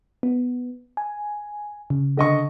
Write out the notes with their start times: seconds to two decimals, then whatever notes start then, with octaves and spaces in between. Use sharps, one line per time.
0.23 B3
0.97 G#5
1.90 C#3
2.17 D3 D#5 C#6